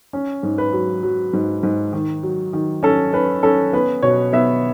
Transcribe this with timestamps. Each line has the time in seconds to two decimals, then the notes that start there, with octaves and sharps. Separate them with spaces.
0.13 C#4
0.43 G#2
0.58 B4
0.73 F#3
1.03 F#3
1.33 G#2
1.63 G#2
1.93 D#3
2.23 F#3
2.53 D#3
2.83 C#4 A4
3.13 C#4 B4
3.43 C#4 A4
3.73 B3 B4
4.03 B2 C#5
4.33 B3 E5